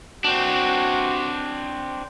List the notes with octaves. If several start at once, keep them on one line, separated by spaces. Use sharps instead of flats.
C4 D4 F#4